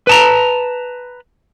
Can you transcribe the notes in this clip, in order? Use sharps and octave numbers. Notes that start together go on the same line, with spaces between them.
B4 A5 A#5